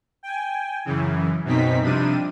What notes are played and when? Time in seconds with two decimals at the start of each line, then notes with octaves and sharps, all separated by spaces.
0.23 G5 G#5
0.85 F#2 C#3 E3
1.44 F#2 B2 C4 D#4 B6
1.82 C3 F3 G3 D4 D#7